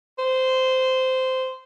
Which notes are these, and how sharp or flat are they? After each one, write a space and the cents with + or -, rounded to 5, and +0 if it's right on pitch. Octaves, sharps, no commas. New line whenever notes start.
C5 -15